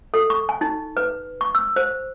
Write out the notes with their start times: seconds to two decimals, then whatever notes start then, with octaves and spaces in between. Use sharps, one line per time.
0.14 A4
0.30 C#6
0.49 G#5
0.61 D#4
0.97 B4
1.41 C#6
1.55 E6
1.76 C5